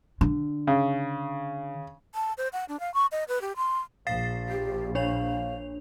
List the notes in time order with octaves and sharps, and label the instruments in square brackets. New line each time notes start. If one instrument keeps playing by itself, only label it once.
[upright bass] D3
[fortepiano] C#3
[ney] A5
C5
F#5
D4
F5
C#6
D#5
B4
G4
C6
[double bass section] A#1 [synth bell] F5 A6 C7
[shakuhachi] G4
[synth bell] D4 C#5 F7 [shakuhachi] F5